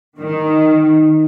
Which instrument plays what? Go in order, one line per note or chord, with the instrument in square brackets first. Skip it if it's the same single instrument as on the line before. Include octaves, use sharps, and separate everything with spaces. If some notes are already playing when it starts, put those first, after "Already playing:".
[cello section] D#3